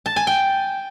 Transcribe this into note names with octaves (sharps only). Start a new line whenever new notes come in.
A5
G#5
G5